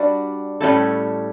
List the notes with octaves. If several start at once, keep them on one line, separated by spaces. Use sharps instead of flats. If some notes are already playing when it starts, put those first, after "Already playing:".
Already playing: G3 D4 F#4 B4
A2 G3 C#4 E4 A4